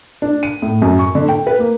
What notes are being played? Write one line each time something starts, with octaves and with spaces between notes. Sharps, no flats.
D4
D#7
A2
F#2
C#6
D3
G5
B4
A#3